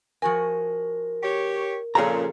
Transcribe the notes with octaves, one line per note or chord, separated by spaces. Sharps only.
F3 F#4 A#4 G#5
G4 C#5
F2 A#2 C#3 F3 G#4 A4 A#5